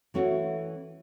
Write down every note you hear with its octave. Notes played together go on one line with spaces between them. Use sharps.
E3 A3 C#4 F#4